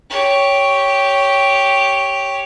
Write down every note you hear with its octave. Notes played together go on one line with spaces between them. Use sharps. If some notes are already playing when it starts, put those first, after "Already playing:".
G4 C#5